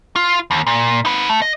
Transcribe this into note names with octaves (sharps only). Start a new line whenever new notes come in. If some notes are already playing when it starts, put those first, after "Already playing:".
F4
D#2
A#2
D#4 B4
A3
D#5